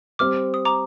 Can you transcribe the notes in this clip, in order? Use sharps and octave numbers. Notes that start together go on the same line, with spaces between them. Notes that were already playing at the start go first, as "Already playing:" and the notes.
G3 C4 G4 C5 D6 F6
D#6
A#5 D6